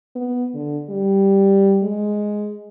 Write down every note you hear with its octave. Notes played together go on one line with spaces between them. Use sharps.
B3
D3
G3
G#3